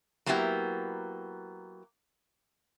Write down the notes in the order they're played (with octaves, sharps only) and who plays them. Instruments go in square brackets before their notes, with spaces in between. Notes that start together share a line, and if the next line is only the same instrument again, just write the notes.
[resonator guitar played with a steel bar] F#3 A#3 B3 E4 G4